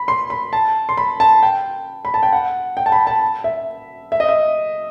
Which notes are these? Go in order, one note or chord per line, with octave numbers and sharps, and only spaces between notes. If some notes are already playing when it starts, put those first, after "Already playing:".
Already playing: B5
C6
B5
A5
C6
B5
A5
G5
B5
A5
G5
F#5
G5
A5
B5
A5
E5
E5
D#5
E5